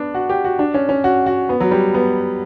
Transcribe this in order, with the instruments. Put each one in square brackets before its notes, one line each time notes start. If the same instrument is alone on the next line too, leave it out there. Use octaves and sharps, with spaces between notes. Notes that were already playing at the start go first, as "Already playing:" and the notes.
Already playing: [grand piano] B3 D4
F#4
G4
F#4
D4
C#4
C#4
F#4
F#4
B3
F#3
G3
B3